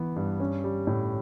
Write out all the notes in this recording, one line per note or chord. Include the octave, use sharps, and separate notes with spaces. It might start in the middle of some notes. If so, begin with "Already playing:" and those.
Already playing: E3 B3
G2
C#4
G3
A2